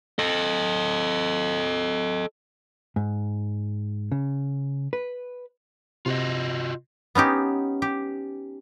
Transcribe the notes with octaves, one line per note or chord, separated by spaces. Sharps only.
A4 D#5
G#2
C#3
B4
C3 F4 F#4 D#5
B3 C#4 D#4 G4
G4